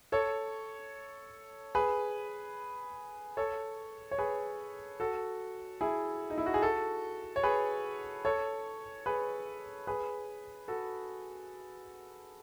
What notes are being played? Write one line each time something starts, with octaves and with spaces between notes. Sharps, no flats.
A4 C#5
G#4 B4
A4 C#5
C#5
G#4 B4
F#4 A4
E4 G#4
D#4
E4
F#4
G#4
F#4 A4
C#5
G#4 B4
A4 C#5
G#4 B4
G#4 B4
F#4 A4